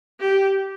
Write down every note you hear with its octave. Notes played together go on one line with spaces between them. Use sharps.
G4